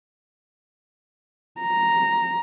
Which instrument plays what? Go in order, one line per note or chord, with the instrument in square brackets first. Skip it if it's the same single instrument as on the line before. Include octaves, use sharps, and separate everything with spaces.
[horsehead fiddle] A#5